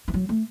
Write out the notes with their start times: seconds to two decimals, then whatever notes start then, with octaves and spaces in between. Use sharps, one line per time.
0.08 E3
0.14 F#3
0.29 A3